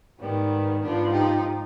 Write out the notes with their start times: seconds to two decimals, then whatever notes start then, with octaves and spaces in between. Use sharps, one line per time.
0.20 G#2 D#3 G3 B3
0.83 G#2 F3 B3 D4
1.13 D#4 G4